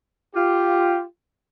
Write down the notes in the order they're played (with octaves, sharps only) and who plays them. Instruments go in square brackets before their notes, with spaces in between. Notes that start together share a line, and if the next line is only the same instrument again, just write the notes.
[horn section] F4 G4